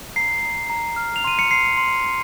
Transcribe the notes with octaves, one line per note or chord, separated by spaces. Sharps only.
A#5 C7
A#5
A#5
F6
F7
C6 D#7
C#7
C6 C7
C6
C6